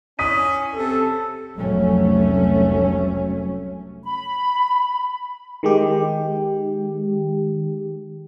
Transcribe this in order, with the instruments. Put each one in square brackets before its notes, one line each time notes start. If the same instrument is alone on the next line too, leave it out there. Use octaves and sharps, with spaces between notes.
[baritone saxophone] C#4 [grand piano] D#6 B6 D#7
[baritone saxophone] C3 [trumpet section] A4
[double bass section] F1 C2 F#3 A3 C#4
[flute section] B5
[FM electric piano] D#3 G#3 G4